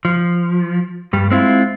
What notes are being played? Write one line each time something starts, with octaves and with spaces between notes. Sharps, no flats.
F3
G2 G3
G#3 C4 E4 F4